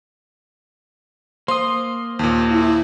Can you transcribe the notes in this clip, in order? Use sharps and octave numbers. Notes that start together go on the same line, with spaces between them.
A#3 C5 C6 D#6
D#2 A#2
E4